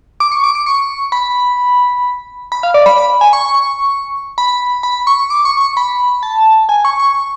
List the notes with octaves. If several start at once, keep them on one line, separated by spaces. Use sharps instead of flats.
D6
C#6
D6
D6
C#6
B5
B5
F5
D5
B5
B5
G#5
C#6
B5
B5
C#6
D6
C#6
C#6
B5
A5
G#5
C#6
C#6